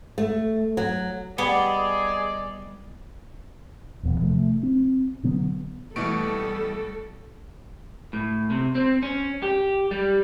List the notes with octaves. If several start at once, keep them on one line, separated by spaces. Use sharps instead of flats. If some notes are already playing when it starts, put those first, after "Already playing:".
A3
F#3
G3 B3 G4 G#4 D5 D#5
D#1 B1 E2
C3 F3 G#3 A3
C4
B2 D3 F#3 B3
B2 E3 G3 A3 A4 C#6 D7
A2
C3
C4
C#4
G4
G3